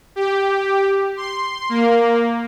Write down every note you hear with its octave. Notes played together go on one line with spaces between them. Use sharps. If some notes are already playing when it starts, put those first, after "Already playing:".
G4
C6
A#3